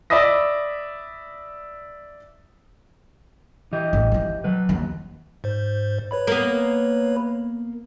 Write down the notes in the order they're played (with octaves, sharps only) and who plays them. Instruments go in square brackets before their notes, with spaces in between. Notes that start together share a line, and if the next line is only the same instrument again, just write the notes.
[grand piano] D5 E5 B5 D#6 A#6
[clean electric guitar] E3 G4 D#5
[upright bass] A1
D#3 F3
[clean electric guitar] F#3 B4
[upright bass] D#2 F3
[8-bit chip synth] G#2 C5
B4 C#5 B5
[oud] A#3 B3